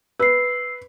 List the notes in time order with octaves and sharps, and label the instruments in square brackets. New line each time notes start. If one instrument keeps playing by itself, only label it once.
[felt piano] B4 [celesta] E6 C7